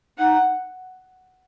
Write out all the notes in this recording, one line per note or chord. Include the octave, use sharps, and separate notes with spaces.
D#4 F#5